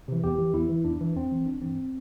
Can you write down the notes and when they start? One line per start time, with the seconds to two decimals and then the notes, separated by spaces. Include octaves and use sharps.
0.08 C3 E3
0.23 E2 G4
0.38 E3
0.54 E2 E4
0.69 E3
0.85 E2 D4
1.00 E3
1.15 E2 C4
1.32 E3
1.46 G1 D4
1.62 G2 E3 C4